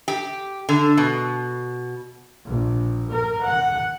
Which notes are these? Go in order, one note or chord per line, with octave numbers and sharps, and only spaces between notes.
G4
D3
B2
A#1
A#4
F#5